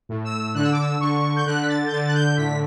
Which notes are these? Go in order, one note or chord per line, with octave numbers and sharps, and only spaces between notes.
A2
E6
D3 F#6
E6
D6
E6
D3 C#6
G6
D3 F#6
B6
A6
G6
D3 A6
F#6
G6
A2 B6